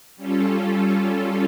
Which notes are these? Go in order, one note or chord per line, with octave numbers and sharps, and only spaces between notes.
G3 C#4 F4 A4